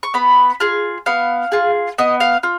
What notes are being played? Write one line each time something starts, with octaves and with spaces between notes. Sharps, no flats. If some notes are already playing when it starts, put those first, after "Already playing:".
C#6
B3 B5
F4 G#4
B3 F5
F4 G#4
B3 D#5
F5
F4